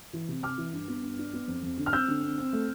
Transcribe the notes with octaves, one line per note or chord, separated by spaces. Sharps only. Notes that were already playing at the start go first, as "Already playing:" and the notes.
E3
C3
C3 D6 F6
E3
G2
B3
G2
D4
B3
F2
F2
D3
F6
C4 E6 G6
D3
C4
C4
A3